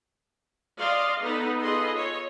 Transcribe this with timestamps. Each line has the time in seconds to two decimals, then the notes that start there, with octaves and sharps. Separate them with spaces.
0.80 D5 D#5 F5 C6
1.23 B3 D#4 A4 B4
1.62 F4 G#4 A4 B4 D#5 C6
1.95 C#5